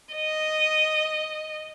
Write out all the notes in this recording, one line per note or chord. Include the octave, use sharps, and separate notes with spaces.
D#5